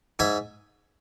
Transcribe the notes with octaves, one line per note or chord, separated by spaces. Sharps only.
G#2 E5 G#5